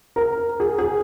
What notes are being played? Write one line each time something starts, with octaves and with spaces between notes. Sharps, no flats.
A#4
G#4
G#4